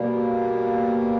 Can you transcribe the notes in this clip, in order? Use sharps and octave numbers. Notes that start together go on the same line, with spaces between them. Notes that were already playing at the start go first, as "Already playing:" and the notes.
Already playing: B2 G3 A#3